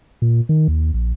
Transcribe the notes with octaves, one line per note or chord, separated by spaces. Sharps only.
A#2
D#3
D#2
A#1